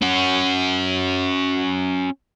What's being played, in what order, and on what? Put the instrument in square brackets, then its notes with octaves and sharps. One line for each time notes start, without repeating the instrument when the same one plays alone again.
[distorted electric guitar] C#4 F#4